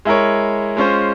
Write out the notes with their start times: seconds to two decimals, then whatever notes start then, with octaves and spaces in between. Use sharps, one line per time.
0.05 G#3 E4 A#4 C#5
0.77 G#3 C#4 F4 C5